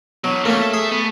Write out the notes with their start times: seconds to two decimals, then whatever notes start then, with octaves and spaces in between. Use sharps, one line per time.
0.24 B2 E3 F#3
0.45 A3 A#3 C#4
0.61 E5
0.74 G#4
0.91 B3